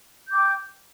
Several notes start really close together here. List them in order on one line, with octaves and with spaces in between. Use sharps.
G6 D6 G5